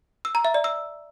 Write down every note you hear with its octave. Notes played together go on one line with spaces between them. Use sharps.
E6
A#5
E5
D5
E6